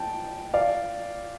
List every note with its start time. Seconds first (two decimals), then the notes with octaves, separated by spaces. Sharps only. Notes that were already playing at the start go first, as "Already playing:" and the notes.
Already playing: G5 A5
0.54 D5 F5